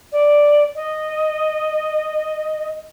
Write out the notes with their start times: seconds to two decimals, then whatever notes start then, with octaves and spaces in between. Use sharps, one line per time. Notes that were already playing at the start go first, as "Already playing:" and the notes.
0.12 D5
0.75 D#5